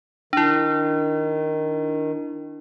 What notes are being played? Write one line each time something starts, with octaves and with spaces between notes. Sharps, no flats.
D#3 D4 E4